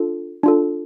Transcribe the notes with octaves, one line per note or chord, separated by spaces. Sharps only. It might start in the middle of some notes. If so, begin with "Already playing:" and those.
Already playing: D4 F4 A4
D4 F4 A4